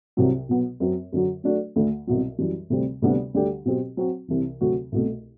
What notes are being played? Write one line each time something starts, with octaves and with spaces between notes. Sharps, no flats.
C2 C3 F#3
B2 F#3 B3
F#2 F#3 C4
F#2 D3 F#3
F#3 A3 D4 F#4
D2 D3 A3
C2 B2 F#3
F#2 E3 G3
D2 C3 G3 C4 G4
D2 C3 G3 B3 D4
D2 D3 G3 D4 G4
B2 F#3 C4 G4
F#3 C4 F#4
C2 C3 E3
D2 C3 F#3 C4 F#4
C2 B2 A3